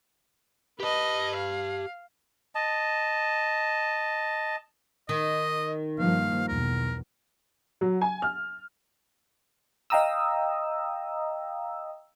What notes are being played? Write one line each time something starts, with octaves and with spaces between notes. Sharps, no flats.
G4 B4 D#5 A5
F5
D#5 A5
D#3 D#5
G2 F3 A#3 F5
B1 E2 A#4
F#3
G#5
F6
D#5 F5 G5 A#5 D#6 E6